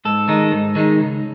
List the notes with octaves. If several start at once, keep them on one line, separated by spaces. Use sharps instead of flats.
G#2 A4
D#3 G#3 D#4
G#2
D#3 G#3 D#4
C#2